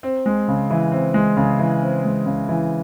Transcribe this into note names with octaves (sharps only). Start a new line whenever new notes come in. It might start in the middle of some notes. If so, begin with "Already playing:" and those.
C4
G#3
C#3
E3
C4
G#3
C#3
E3
C4
G#3
C#3
E3